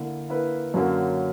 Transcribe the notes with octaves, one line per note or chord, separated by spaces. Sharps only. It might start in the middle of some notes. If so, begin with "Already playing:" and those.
Already playing: D3 A#3 E4
D3 A#3 E4 B4
F#2 D3 F#3 A#3 C#4